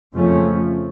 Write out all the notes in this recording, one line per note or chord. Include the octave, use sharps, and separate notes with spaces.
F2 C#3 F3 A3 C#4